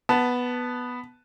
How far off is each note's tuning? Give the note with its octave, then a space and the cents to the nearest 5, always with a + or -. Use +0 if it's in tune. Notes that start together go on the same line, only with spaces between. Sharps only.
B3 +0 A5 +0